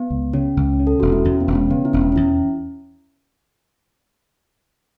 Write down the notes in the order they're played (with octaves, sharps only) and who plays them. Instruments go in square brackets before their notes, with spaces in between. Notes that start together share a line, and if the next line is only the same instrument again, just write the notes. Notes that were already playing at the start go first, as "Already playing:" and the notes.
Already playing: [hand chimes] B3
[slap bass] C#2
[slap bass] C#3 [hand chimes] C#4
[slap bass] C#2
C#3
[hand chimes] A4
[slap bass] E1 [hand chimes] F#4
[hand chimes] E4
[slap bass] E2 [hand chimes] C#4
[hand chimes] B3
[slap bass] E1
[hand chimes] C#4
[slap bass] C#3 [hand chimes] B3
[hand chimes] E4
[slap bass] E1 [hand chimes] C#4
[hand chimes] C#4
[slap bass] E2 [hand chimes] E4